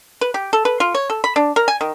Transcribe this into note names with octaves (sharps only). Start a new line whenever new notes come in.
B4
G4
A4
B4
F4
C#5
A4
B5
D4
A#4
G#5
D#3